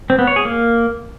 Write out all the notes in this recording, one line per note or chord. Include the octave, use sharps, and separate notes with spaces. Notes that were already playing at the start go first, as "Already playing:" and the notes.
C4
B3
C#5
G#4
A#3